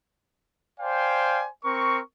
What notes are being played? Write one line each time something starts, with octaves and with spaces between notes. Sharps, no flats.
C5 D5 F5 G5 G#5
C4 A#4 C#6